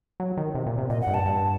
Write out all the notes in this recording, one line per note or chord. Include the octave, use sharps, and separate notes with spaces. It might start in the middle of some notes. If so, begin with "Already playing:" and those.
F#3
D#3
C3
A#2
C3
A#2 D#5
F#5
G2
A5
G2